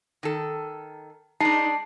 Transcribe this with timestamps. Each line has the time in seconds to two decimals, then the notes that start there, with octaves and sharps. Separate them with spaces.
0.23 D#3 A4
1.40 G#3 D4 D#4 A5 C7